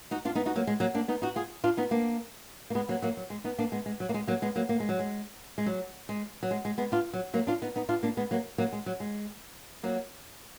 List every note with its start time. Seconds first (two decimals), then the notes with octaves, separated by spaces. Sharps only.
0.11 D#4 F#4
0.25 D4 F4
0.35 B3 D#4
0.46 D#4 F#4
0.56 F#3 A#3
0.67 G#3
0.80 F#3 A#3
0.95 A#3 D4
1.08 B3 D#4
1.22 D#4 F#4
1.36 F4 G#4
1.64 D4 F4
1.77 B3 D#4
1.91 A#3 D4
2.70 A#3
2.75 G#3 B3
2.88 F#3 A#3
3.02 F#3 A#3
3.17 F#3
3.30 G#3
3.44 B3 D#4
3.58 A#3 D4
3.72 G#3 B3
3.86 G#3
4.00 F#3
4.09 A#3
4.14 G#3
4.27 F#3 A#3
4.42 G#3 B3
4.56 F#3 A#3
4.69 A#3
4.80 G#3
4.89 F#3
4.99 G#3
5.58 G#3
5.66 F#3
6.09 G#3
6.43 F#3
6.51 G#3
6.65 G#3
6.78 G#3 B3
6.92 D4 F4
7.13 F#3
7.34 F#3 A#3
7.47 D4 F4
7.62 B3 D#4
7.76 B3 D#4
7.89 D4 F4
8.03 A#3 D4
8.17 G#3 B3
8.31 F#3 A#3
8.58 F#3 A#3
8.73 G#3
8.86 F#3
9.00 G#3
9.83 F#3 A#3